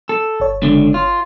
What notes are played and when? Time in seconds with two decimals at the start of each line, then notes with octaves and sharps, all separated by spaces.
0.09 A4
0.40 G1 C#5
0.63 C#2 D3
0.94 F4